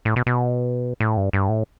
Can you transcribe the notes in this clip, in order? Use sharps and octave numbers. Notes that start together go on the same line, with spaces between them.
A2
B2
B2
A2
G2
G2
A2